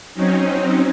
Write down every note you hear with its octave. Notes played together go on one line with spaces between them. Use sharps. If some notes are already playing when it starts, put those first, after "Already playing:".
F#3 C4 C#4 D#4